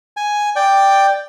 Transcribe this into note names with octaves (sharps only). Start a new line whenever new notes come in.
G#5
D5 G5